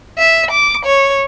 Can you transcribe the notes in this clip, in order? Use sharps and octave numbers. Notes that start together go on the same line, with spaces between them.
E5
D6
C#5